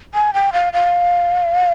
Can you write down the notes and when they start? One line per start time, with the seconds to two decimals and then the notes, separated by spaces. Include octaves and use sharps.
0.14 G#5
0.34 G5
0.53 F5
0.73 F5